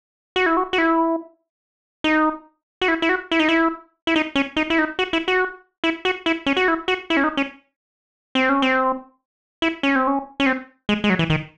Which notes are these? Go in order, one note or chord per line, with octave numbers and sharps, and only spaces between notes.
F#4
E4
F#4
F#4
E4
D#4
F#4
E4
E4
F#4
E4
D#4
E4
E4
D#4
C#4
D#4
E4
D#4
F#4
E4
F#4
E4
F#4
E4
C#4
F#4
E4
F#4
E4
C#4
D#4
C#4
C4
C#4
C4
E4
C#4
C4
C#4
C#4
C4
G#3
G#3
F#3
E3
D#3